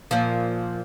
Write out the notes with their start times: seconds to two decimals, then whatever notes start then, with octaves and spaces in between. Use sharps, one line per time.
0.11 A#2 F3